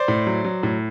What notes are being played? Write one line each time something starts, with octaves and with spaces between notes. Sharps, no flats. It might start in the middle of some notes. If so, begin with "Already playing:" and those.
Already playing: C5 D5
A2
F#3
F#3
A2